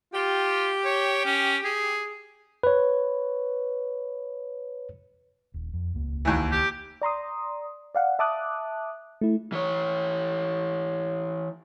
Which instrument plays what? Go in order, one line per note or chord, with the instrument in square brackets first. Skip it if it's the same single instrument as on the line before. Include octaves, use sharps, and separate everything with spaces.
[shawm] F4 [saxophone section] G4
[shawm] C#5
C#4
G#4
[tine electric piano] B4 C#5
[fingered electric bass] D#1
F2
D#1 C#2 A#3
[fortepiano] D#2 E3
[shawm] G4
[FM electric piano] D5 A#5 C6 D#6
D5 F5 F#5
E5 A5 D6 D#6 F#6
A3 E4
[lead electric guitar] E3 C#5